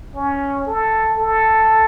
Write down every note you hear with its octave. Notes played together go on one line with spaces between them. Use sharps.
C#4
A4
A4